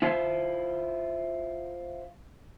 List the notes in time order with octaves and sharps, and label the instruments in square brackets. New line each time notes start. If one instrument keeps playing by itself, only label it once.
[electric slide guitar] E4 F4 C5